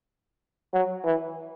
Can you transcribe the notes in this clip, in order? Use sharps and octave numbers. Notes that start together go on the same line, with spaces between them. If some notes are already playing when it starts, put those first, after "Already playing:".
F#3
E3